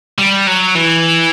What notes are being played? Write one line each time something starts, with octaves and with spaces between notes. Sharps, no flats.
G3
F#3
E3